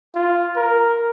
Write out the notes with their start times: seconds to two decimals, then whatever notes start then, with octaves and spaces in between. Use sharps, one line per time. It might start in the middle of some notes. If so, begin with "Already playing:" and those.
0.15 F4
0.56 A#4